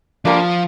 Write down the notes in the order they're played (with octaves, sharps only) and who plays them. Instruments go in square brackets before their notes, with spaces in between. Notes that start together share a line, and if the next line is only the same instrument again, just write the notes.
[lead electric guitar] F3 [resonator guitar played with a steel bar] G3 A#3 D4